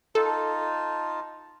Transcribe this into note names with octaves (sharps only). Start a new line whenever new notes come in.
D#4 F4 A4 A5